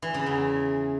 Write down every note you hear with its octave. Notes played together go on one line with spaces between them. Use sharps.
E3
C#3
E2